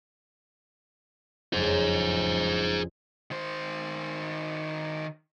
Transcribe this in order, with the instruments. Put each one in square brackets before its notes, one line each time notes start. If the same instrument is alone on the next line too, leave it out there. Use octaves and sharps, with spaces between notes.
[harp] F#1 F2 [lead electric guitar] G#4 C5
[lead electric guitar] D#3 C5